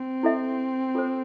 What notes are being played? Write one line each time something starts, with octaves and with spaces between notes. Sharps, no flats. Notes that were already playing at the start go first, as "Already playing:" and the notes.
Already playing: C4
E4 A4 E5
F4 A4 C5